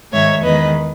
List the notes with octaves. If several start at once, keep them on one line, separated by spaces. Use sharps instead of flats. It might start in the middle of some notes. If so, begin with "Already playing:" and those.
G#2 D#3 G#3 C#5 E5
E2 D#3 G#3 B4 D#5